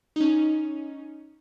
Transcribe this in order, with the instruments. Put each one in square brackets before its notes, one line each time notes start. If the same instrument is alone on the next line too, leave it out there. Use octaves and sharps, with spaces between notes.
[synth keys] C#4 D#4